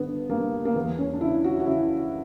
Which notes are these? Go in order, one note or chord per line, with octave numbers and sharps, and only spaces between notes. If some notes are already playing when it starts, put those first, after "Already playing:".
Already playing: G2 D3 B3
G2 A#3
A#3
E2 B3
C#4
D4
C#3 E4
F#4
F#4
C#3 E4